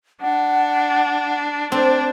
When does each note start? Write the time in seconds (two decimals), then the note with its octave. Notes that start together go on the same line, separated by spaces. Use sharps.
0.21 D4 F#5
1.72 C4 D4 C5